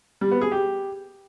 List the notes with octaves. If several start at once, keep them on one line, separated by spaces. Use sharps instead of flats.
G3
B3
G#4
G4